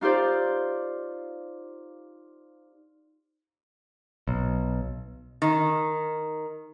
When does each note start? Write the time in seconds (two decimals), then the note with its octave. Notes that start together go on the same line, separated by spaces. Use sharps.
0.01 D#4 F4 G4 C5 D5
4.28 B1
5.42 D#3